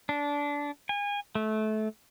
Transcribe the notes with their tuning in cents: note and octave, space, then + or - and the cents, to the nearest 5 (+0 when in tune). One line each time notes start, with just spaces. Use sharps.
D4 -20
G#5 -30
A3 -25